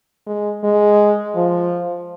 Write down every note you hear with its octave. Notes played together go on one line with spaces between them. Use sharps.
G#3
G#3
F3